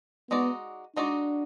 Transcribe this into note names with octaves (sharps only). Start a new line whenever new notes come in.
G#3 B3 D#4 F#4 D5
G#3 D4 D#4 F#4 D5